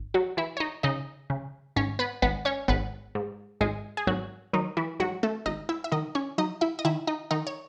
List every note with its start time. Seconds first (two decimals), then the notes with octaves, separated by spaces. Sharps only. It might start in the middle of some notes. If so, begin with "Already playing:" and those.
Already playing: G#1
0.14 F#3 F#4
0.37 E3 E4 E5
0.57 C#5
0.60 D#4 D#5
0.83 C#3 D#4 D#5
1.30 C#3
1.76 G#1 C#4 C#5
1.99 B3 B4
2.22 G#1 B3 B4
2.45 C#4 C#5
2.68 G#1 B3 B4
3.15 G#2
3.61 G#1 G#3 G#4
3.97 G#4
4.07 G#1 F#3 F#4
4.53 D#3 F#3 D#4
4.77 E3 E4
5.00 G#2 F#3 F#4
5.23 A3 A4
5.46 G#1 D#4 D#5
5.69 E4 E5
5.84 E5
5.92 D#3 D#4 D#5
6.15 C#4 C#5
6.38 F#3 D#4 D#5
6.61 E4 E5
6.79 D#5
6.85 D#3 E4 E5
7.07 D#4 D#5
7.31 D#3 D#4 D#5
7.47 C#5